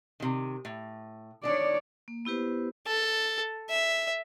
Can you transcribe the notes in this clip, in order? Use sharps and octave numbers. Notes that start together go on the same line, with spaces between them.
C3 D#3
A2
D#3 D4 C#5 D5
A#3
B3 E4 G4 B4 C5
A4
E5